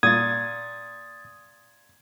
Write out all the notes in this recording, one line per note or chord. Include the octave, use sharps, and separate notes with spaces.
A#2 D#6 G#6 A6